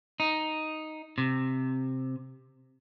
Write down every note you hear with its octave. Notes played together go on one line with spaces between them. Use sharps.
D#4
C3